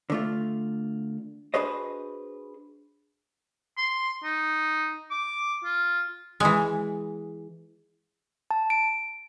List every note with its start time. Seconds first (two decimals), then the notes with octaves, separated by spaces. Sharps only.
0.10 D3 A3 F4
1.54 D4 F#4 G#4 B4 C5 D#5
3.77 C6
4.24 D#4
5.11 D6
5.64 F4
6.40 E3 G#3
8.51 A5
8.70 D7